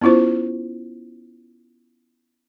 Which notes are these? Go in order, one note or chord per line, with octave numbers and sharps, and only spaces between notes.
B3 C#4 E4 F4 C5